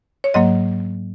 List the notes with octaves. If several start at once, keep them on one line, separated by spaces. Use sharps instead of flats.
C#5
G#2 F#3 A#3 D#5